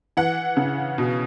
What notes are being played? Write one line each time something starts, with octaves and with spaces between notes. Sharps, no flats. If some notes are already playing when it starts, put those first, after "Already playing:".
E3 F#5
C#3
B2